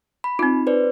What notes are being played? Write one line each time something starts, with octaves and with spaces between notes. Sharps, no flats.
B5
C4 D#4 F4
B4 C5 D5